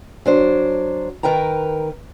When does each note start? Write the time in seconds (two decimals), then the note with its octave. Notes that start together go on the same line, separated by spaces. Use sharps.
0.26 F#3 D4 C5
1.23 D#3 A#4 B4 G5 A#5